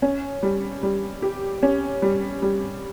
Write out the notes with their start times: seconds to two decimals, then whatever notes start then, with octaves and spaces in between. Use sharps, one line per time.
0.02 C#4
0.43 G3
0.83 G3
1.22 G4
1.63 C#4
2.02 G3
2.42 G3